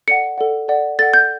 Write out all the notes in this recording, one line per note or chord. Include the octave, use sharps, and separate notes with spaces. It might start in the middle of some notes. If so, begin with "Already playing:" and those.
A4 D5 F#5 C#7
A4 D5 F#5
A4 D5 F#5
A4 D5 F#5 A6
G6